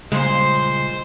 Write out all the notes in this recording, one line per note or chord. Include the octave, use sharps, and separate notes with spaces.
A#2 C#3 G3 G#3 C5 C6